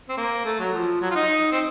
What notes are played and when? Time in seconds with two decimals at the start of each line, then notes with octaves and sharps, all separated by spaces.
0.09 C4
0.17 A#3
0.45 A3
0.59 F#3
0.74 F3
1.01 F#3
1.10 F4
1.16 D#4
1.52 C4